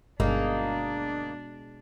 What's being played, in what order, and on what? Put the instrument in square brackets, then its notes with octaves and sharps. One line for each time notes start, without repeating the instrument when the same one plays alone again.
[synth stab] G1 [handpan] B2 G#3 G#4 [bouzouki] A#3 D#4 [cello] D4